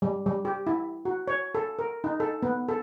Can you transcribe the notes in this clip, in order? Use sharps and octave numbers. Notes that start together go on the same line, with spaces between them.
G3
G3
G4
E4
F#4
C#5
A4
A#4
D#4
A4
B3
A4